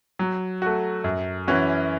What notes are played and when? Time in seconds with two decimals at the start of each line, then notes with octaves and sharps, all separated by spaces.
0.19 F#3
0.62 A3 F#4
1.04 F#2
1.47 E3 C#4 F#4